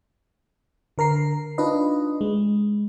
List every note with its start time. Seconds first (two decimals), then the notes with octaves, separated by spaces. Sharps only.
0.98 D3 A#4 A#5 C7
1.58 D4 D#4 F4 B4 D#5
2.21 G#3